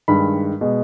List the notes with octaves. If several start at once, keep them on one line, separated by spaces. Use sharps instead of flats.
G2 D#3 G#3 B5
B2 G#3